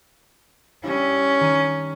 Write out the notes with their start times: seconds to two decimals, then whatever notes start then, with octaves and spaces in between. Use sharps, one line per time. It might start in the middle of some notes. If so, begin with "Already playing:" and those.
0.84 G3 C#4 D4 E4
1.40 D#3 D#7